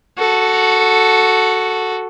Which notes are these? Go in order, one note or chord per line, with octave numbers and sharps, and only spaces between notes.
F#4 A4